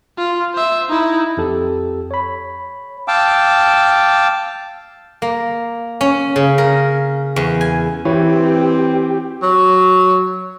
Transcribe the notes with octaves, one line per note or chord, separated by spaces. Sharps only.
F4
C5 E5
D#4 E4
F2 G4 A4
C#5 B5
F5 G5 A5 D6 E6
A#3
C#4
C#3
A#4
E2
G#5
E3 C4 G4 B4 C#5
F#3